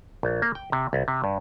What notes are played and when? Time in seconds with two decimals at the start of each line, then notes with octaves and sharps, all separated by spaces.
0.23 A#1
0.42 A#3
0.55 G5
0.72 C3
0.93 C2
1.08 C3
1.24 G2